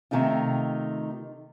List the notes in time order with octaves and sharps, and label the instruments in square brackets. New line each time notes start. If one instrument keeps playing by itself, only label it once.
[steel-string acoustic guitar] C3 D#3 A3 D#4 F4